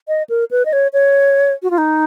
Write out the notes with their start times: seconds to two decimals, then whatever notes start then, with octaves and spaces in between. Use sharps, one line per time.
0.08 D#5
0.29 A#4
0.51 B4
0.65 D#5
0.73 C#5
0.93 C#5
1.63 F#4
1.70 F4
1.78 D#4